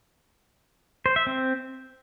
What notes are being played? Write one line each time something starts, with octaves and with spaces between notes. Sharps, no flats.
C5
E5
C4